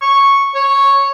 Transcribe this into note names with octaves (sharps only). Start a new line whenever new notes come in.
C#6
C#5